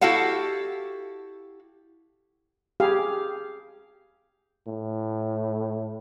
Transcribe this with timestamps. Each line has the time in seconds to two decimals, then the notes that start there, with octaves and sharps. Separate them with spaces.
0.01 E4 F#4 G4 A4 F5 F#5
2.80 G4 G#4 F5
4.67 A2